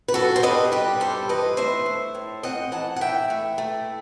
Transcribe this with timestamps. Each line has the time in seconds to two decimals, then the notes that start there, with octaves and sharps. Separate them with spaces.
0.08 B4
0.14 G2 F#4 A4
0.36 C5
0.43 G3 B4 D#5
0.72 G3 G4 B4
1.00 G2 A4 C5
1.29 E3 B4 D#5
1.57 A3 C5 E5
1.86 A3
2.15 A2
2.43 C4 D#5 F#5
2.72 E3 F#5 A5
2.96 F#5
3.01 E3 E5 G5
3.30 A3
3.58 A3